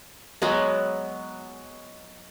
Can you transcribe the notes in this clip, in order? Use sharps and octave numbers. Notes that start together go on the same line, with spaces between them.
F#3 G#3 B3